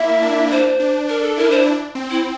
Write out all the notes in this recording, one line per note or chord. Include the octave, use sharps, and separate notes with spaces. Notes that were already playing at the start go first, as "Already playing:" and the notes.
Already playing: A#3 E4 E5
D4
D4 C5
D4
D4 A#4
A4
E4 A#4
C5
D4
C4
E4